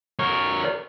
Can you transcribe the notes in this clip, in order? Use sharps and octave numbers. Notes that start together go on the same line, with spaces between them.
A#4 C#5